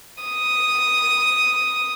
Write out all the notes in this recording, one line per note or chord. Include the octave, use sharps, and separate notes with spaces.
D#6